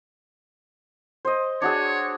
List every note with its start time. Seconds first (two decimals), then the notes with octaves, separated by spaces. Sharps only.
1.25 C5 D#5
1.62 D4 F#4 G#4 C#5